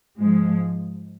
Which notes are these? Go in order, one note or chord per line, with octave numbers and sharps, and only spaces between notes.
G#2 F3 G#3